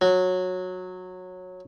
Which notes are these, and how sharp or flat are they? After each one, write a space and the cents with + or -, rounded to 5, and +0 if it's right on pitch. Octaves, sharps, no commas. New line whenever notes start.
F#3 -15